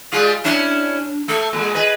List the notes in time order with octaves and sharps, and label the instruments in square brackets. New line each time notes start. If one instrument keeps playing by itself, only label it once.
[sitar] G3 G#3 F4 [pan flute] G#4
[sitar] G3 C#4 E4 [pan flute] D4
[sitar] A3 [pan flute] A4
[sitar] A#2 G#3
[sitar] G#4 B4 [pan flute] D#5